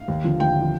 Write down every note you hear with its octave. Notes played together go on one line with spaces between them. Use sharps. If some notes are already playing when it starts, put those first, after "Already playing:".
Already playing: F5
D#2
D3 F3
D#2 G5
D3 F3